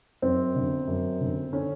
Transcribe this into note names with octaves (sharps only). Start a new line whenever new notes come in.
F#2 C4
G1
F#2
G1
D3 C#4